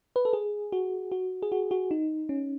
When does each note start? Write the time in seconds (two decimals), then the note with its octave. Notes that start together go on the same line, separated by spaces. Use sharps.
0.16 B4
0.25 A4
0.33 G#4
0.72 F#4
1.12 F#4
1.42 G#4
1.52 F#4
1.71 F#4
1.91 D#4
2.29 C#4